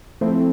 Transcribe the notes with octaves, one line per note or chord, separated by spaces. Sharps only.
F3 A3 C4 E4